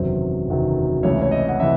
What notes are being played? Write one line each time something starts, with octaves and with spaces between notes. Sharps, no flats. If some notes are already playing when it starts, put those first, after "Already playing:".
Already playing: F#1 E2 C3 D#3 F#3 C5
F#1 E2 C3 D#3 F#3
C#2 C3 E3 A3 C#5
C#5
D#5
F#5
C3 E3 E5